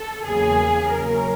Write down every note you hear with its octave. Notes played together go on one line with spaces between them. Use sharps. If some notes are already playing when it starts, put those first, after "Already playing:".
Already playing: A4
E2 C#3 F#3 A#3 G#4
C#3 F#3 A#3 C#4 A#4